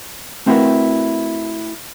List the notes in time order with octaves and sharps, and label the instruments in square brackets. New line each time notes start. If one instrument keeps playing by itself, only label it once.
[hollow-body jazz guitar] A3 C4 E4 F#4 A#4 B4